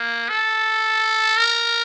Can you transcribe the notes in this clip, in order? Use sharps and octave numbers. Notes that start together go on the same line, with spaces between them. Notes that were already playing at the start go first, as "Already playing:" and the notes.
Already playing: A#3
A4
A#4